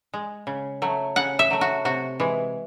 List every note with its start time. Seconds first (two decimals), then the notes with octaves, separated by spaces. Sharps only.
0.14 G#3
0.47 C#3
0.82 F#3 A3
1.16 C#3 F#5
1.39 E5
1.51 F#3 A3
1.61 F#4
1.85 C3 F#4
2.20 E3 G#3